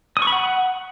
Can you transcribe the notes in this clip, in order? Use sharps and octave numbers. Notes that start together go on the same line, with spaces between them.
D#6
C#6
B5
F#5